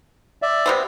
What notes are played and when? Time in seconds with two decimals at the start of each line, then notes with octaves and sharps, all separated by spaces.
0.42 D5 E5
0.66 C3 B3 C4